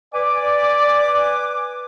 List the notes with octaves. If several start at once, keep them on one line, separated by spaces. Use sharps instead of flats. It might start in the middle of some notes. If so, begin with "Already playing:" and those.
B4 D5 G#5 D6